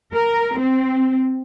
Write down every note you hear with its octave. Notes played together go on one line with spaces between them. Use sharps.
A#4
C4